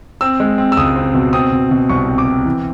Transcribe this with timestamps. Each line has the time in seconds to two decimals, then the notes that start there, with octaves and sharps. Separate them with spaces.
0.21 C4 E6
0.40 G#3
0.58 C4
0.72 E6
0.77 C#2 D#6
0.96 C4
1.14 B2
1.33 C4 D#6
1.52 B2
1.71 B2
1.89 C2 C#6
2.08 C4
2.18 D6
2.28 C4
2.45 E3